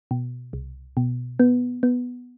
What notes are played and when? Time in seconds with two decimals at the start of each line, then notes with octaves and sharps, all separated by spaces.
0.11 B2
0.53 C2
0.97 B2
1.39 B3
1.83 B3